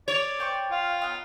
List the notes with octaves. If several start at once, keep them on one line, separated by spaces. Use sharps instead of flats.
C#5 D5
C5 G5 C#6
F4 F5
B3 D#4